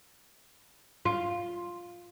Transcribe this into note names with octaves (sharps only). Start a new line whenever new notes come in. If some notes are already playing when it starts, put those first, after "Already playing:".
F4